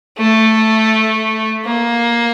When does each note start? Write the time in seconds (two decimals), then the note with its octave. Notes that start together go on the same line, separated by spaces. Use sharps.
0.18 A3
1.65 A#3